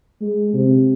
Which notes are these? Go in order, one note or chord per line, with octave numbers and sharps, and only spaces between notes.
G#3
C3